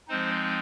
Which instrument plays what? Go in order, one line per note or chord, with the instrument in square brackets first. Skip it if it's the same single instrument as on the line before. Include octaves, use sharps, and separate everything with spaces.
[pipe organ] F3 G#3 C4 D#4 C5